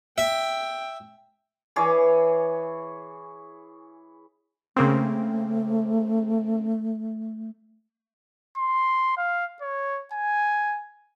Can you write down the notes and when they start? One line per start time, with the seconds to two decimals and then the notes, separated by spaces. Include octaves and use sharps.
0.18 E5 G5
1.76 E3 G#4 C#5 D6
4.77 C#3 A3 A#3 C4
8.58 C6
9.17 F5
9.61 C#5
10.13 G#5